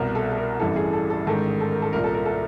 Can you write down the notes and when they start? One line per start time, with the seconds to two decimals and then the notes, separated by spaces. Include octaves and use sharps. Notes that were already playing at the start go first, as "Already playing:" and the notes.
Already playing: C2 B2 A#4
0.15 A4
0.32 A4
0.37 A#4
0.60 A1 G2 E3 A4
0.76 G#4
0.93 A4
1.10 A4
1.27 A1 G#2 D#3 A4
1.61 A4
1.71 A#4
1.82 A4
1.93 C2 A#2 A#4
2.04 A4
2.14 A#4
2.26 A4